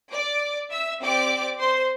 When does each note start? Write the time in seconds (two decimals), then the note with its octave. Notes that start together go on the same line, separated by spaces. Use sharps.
0.11 D5 D6
0.70 E5 E6
1.00 C4 G4 D5 D6
1.59 C5 C6